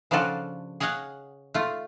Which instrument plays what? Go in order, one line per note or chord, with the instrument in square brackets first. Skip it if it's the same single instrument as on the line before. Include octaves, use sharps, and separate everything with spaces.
[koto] C#3 F3 D4 F4 F#4 A4
G#4 C#5 D#5 F5 F#5
A3 F4